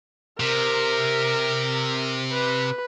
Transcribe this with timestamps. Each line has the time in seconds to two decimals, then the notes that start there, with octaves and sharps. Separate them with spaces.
0.40 C3 A#4
2.32 B4